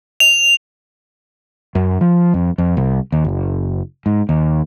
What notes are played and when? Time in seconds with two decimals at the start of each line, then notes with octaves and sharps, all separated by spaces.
0.20 F7
1.75 F#2
2.01 F3
2.34 F2
2.58 F2
2.77 C2
3.12 D#2
3.25 F#1
4.06 G#2
4.29 D#2